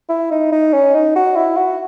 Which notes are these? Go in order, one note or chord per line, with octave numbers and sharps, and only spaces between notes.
E4
D#4
D#4
C#4
D#4
F#4
E4
F#4